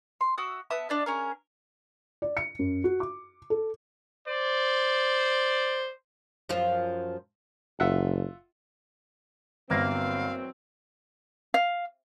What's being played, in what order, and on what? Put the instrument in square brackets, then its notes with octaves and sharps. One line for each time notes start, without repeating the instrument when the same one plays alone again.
[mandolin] C6
F#4 E5 D#6
B3 E5 A5 D#6
D4 D5 D#5
C#4 G#4 A#4
[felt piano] D5
C#7
F#2
F#4
D6
A4
[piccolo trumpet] C5 [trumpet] D5
[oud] F#2 F3 F4
[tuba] F#1 [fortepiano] F4 E5 F#5
[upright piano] G1 [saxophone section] E3 F#3 C4 [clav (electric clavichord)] A#3 [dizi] F5
[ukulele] F5